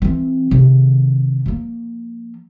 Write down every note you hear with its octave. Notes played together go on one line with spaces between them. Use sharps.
E3 C4
C3 D#3
F3 A#3